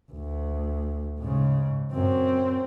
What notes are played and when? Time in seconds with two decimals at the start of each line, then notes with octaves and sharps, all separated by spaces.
0.11 D2
1.20 G#2 C#3
1.93 F#2 C4